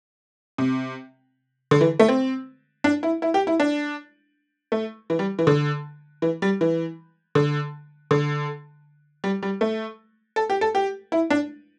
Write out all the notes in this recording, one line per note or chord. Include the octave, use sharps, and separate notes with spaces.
C3
D3
E3
A3
C4
D4
E4
E4
G4
E4
D4
A3
E3
G3
E3
D3
E3
G3
E3
D3
D3
G3
G3
A3
A4
G4
A4
G4
E4
D4